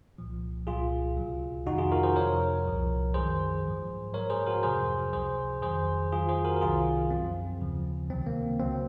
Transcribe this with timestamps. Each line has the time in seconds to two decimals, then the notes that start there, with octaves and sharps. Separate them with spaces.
0.18 C2 A#2 F3
0.67 C2 A#2 F#3 F4 G#4
1.16 C#2 C3 F#3
1.66 F2 C3 D#3 D#4 F#4
1.78 F4 G#4
1.92 F#4 A#4
2.03 G#4 C5
2.16 F2 C3 F3 A#4 C#5
2.66 C2 A#2 F3
3.14 F#2 D#3 F#3 G#4 C5
3.65 G#2 F3
4.13 G#2 F#3 A#4 C#5
4.30 G#4 C5
4.47 F#4 A#4
4.63 F2 C3 F3 G#4 C5
5.12 C#2 C3 F#3 G#4 C5
5.62 F2 D#3 F#3 G#4 C5
6.12 F2 D#3 F#3 F4 G#4
6.29 G#4 C5
6.44 F#4 A#4
6.56 A#4
6.61 C2 C3 D#3 F#3 F4 G#4
7.10 F#2 F3 C4
7.61 D#2 C#3 F3
8.10 C#2 C3 D#3 F#3 C4
8.26 A#3
8.60 C#2 C#3 F#3 C4